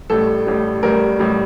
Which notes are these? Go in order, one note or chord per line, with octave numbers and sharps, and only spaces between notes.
A1 A2 G3 A4
A1 A2 G3
A1 A2 G3 A#4
A1 A2 G3